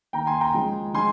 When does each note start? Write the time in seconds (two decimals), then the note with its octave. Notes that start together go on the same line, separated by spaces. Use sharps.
0.13 D#3 A#3 G5 A#5
0.27 G#5 C6
0.41 G5 A#5
0.54 C#3 F3 G#3
0.94 F3 G#3 G#5 C6